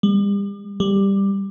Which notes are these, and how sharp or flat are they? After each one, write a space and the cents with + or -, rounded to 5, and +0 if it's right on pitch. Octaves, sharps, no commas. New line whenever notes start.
G3 +40
G3 +10